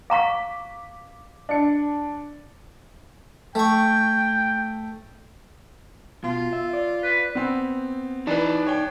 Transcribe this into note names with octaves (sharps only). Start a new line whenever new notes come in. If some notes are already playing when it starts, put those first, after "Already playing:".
F5 A#5 C#6 D6 B6
D4 C#7
A3 G5 C#6
B2 F4
E5
D5
B4
B3 C4
E3 D#4 B4 D5
C#5 G5